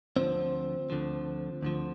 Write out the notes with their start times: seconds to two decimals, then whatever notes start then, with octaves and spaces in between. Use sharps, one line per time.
0.16 D2 D3 F3 C4
0.90 D2 D3 F3
1.62 D2 D3 F3